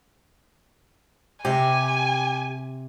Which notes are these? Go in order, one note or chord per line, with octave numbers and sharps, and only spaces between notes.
C3 G4 G#5